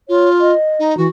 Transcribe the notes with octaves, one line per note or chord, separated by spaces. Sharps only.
F4 C#5
D#5
D#4
E3 F#4